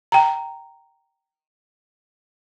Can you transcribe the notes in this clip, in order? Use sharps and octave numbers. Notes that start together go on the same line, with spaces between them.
G5 A#5